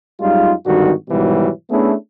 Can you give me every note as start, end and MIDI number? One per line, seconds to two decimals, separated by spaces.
0.21 0.52 42
0.21 0.52 55
0.21 0.52 56
0.21 0.52 63
0.21 0.52 65
0.66 0.92 32
0.66 0.92 43
0.66 0.92 50
0.66 0.92 51
0.66 0.92 66
1.09 1.49 44
1.09 1.49 47
1.09 1.49 51
1.09 1.49 52
1.09 1.49 54
1.09 1.49 55
1.70 1.93 57
1.70 1.93 59
1.70 1.93 61
1.70 1.93 62
1.70 1.93 64
1.70 1.93 68